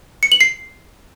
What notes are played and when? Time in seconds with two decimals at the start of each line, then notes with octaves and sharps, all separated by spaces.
0.23 C#7
0.32 F#7
0.41 C7